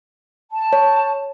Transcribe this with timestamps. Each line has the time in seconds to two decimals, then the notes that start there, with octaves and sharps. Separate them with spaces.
0.51 A5
0.73 C#5